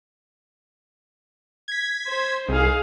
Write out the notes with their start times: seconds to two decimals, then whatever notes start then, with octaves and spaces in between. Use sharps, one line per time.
1.68 G#6 B6
2.08 C5
2.48 C2 D#4 G#4 F5